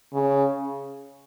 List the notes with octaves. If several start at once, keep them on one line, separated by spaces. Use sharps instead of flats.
C#3